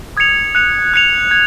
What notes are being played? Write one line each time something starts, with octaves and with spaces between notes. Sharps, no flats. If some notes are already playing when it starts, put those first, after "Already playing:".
D#6 G#6 C#7 F7
F#6 C#7 F7
F#6 C#7 F7
G#6